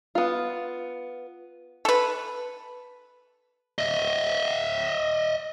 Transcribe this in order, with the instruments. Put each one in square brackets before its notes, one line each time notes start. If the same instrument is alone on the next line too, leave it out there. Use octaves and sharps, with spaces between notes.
[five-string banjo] B3 F4
[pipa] A4 B4
[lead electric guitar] D#5 E5